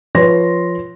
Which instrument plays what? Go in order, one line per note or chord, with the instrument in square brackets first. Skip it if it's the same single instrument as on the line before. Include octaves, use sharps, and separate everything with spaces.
[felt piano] F3 B4 C#5 C6 A#6